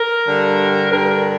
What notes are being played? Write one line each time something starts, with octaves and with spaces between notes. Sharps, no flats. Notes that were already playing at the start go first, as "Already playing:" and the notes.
Already playing: A#4
G2 D3 G3
G2 D3 G3 A#4